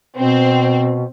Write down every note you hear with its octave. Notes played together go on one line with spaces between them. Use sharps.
B2 C4